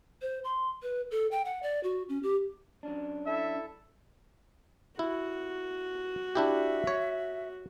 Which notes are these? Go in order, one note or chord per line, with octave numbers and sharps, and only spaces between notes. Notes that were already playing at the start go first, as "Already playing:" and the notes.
C5
C6
B4
A4
G5
F#5
D5
F#4
C#4
G4
F#3 C#4 D4
E4 A4 E5
E4 F#4
D4 E4 G4 E5
C#5